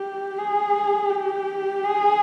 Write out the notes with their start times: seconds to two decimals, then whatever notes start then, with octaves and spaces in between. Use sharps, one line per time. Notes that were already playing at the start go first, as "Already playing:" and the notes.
Already playing: G4
0.38 G#4
1.10 G4
1.83 G#4